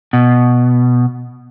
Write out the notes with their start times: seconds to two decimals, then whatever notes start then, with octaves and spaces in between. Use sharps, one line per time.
0.13 B2